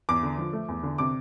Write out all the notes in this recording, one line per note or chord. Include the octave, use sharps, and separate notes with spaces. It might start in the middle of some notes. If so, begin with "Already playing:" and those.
E2 D6
D3
F3
A3
E2
D3
C3 D6